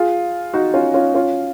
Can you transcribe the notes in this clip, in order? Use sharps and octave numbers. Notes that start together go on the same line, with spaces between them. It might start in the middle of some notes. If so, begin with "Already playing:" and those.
Already playing: F4 G#4
D#4 F#4
C#4 F4
C#4 F4
C#4 F4